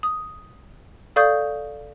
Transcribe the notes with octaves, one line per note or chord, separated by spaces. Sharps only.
D#6
A4 D5 F5 C#6 D#6 G6